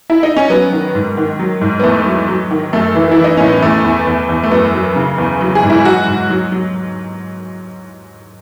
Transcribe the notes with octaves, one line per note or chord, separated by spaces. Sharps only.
E4
D#4
C#4
F#3 B3
D#3
G#2
D#3
F#3
G#2
B3
E2 A3
F#3
F#3
D#3
F#2 A3
E3
E4
E3
D#4
A2 C#4
B3
E2 A3
E2
E2
E2
A3
F#2 B3
F#3
C#3
E2
F#3
G#4
G#2
E4
F#3 F#4
G#2
F#3
F#3